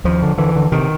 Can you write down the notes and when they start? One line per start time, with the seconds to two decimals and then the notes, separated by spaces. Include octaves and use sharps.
0.04 D#2 F3
0.22 D3
0.38 D3 E3
0.56 D3
0.72 C3 D#3